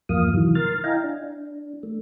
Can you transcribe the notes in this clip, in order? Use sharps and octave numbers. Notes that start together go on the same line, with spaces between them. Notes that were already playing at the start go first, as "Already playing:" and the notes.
E2 G2 F3 A#3 F5 D#6
C3 D#3 E3 F#3
A#4 C6 F6 A6
E4 D#5 F5 G5 G#5 A#5
D4
A3